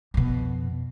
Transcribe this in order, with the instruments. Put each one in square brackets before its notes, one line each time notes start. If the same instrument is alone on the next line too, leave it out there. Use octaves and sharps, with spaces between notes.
[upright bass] F2 B2